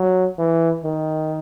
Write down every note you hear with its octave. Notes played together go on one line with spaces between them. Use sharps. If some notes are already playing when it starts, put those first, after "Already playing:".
Already playing: F#3
E3
D#3